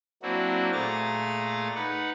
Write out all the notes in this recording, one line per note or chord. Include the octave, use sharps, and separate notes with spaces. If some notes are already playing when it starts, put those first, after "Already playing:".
F#3 A#3 C4 D4 E4 F#4
A#2 A3 G#4 A#5 A6
D#4 B4 F#5